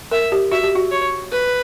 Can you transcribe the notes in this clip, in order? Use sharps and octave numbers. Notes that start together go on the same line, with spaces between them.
A#4 E5
G4
F#4 E5
G4
F#4
C#5
B4